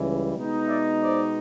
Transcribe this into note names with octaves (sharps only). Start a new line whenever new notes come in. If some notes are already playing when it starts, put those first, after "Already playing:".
Already playing: C#2 C#3 E3 G3
B2 G#3 B3 D#4
D5 E5
C5 D5